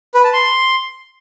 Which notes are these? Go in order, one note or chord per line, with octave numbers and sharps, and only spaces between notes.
B4
A5
C6